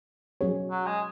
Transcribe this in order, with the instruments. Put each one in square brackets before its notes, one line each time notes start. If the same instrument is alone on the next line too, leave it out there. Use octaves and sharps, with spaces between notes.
[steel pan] F#3 C#4 G#4 C#5
[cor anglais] F#3
G#3